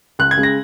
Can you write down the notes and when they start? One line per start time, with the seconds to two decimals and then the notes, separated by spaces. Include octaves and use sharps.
0.19 C#2 F#6
0.31 G#6
0.37 C#3 G#3
0.43 A#6